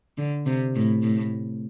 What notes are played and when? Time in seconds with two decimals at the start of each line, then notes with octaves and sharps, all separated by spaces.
0.18 D3
0.46 C3
0.75 A2
1.03 A2